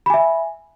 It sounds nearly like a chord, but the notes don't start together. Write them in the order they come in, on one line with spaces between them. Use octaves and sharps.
B5 G#5 E5